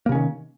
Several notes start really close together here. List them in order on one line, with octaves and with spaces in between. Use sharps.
A#3 C3 C#4 D#3